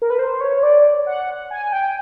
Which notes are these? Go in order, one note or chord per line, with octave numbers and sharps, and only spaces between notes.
A#4
B4
C5
C#5
D5
F#5
G#5
G5